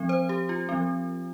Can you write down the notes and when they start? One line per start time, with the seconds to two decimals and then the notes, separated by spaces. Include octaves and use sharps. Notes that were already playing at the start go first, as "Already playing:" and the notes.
Already playing: F3 C4
0.09 C5
0.29 G4
0.49 F4
0.69 F3 C4